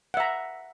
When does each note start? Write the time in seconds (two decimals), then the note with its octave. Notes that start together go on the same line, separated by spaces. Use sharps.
0.14 F#5
0.17 E5
0.20 A#5